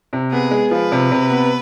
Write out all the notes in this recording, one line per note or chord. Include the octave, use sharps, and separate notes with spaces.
C3
B3 G#4
G#3
F3 B4
C3
C3
B3